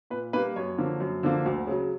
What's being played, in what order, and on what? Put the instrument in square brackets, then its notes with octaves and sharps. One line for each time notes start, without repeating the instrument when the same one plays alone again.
[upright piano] A#2 B4
G3 A#3 B4
F#2 C#5
D3 F3 A#3
F#2
D3 F3 A#3
D2
C#3 F#3